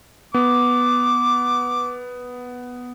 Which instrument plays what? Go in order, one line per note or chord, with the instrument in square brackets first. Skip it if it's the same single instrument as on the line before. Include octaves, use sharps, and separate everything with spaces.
[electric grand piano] B3 [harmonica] D6